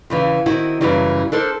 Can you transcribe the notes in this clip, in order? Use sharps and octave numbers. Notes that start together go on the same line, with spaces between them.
E2 C#3 E3
D#3 C4 E4 F#4
F#2 C#3 E3 F#3 G3
D4 A4 A#4 C5